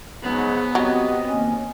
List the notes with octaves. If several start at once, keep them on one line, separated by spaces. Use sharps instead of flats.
G#2 C#3 F#3 B3
F#3 C4 G4 D#5
D#2 C#4